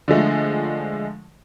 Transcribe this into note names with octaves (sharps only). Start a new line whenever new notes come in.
D3 F3 G#3 A3